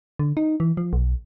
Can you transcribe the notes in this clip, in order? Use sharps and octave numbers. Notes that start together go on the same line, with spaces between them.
D3
D#4
E3
F3
B1